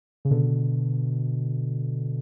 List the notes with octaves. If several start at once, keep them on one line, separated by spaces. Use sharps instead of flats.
C#3
B2 D3